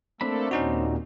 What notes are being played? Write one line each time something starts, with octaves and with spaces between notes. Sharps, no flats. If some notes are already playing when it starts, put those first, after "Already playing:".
A3 A#3 C4 D4 A4 B5
D#2 A#2 C#4 D#4 F#4